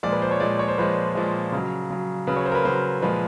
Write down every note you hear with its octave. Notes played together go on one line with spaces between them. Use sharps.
A#2 F3 G#3 D5
B4
C5
C#5
A#2 F3 G#3 D5
C#5
C5
A#2 F3 G#3 B4
A#2 F3 G#3
C#3 F#3
C#3 F#3
C#3 F#3 B4
C#5
C5
A#4
B4
C#3 F#3 C5
A#2 F3 G#3 B4